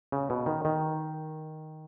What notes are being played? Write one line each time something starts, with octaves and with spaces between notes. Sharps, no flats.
C#3
B2
D#3
D#3